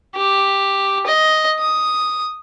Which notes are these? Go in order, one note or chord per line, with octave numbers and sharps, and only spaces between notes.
G4
D#5
D#6